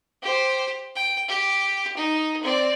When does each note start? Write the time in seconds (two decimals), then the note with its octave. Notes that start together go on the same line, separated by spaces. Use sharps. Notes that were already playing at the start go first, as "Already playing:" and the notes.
0.22 G4 C5
0.96 G5
1.28 G4
1.97 D#4
2.42 C4 D5